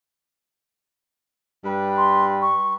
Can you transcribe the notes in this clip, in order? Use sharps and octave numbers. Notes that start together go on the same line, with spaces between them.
G2 G3 B4
C6
C#6